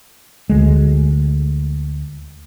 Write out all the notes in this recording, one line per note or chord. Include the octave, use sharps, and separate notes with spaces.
D2 G#3